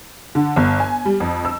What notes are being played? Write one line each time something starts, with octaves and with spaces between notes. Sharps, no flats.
D3
G1
G#5
G3
F2
E6